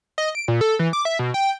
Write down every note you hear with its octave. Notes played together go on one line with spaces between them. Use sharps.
D#5
D7
A#2
A4
E3
D6
E5
B2
G5